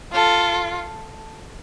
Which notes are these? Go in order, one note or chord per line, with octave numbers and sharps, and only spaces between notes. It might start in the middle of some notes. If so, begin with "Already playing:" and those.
F4 A4